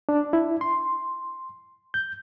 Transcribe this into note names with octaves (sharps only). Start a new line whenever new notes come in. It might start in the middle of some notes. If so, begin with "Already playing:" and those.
D4
E4
C6
G6